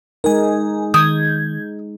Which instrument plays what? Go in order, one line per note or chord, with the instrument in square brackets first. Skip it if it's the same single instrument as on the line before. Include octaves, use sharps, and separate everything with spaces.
[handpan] G#3 D#4 [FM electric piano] A#4 G#5
[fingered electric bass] D#3 [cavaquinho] D#6 [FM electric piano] G6 G#6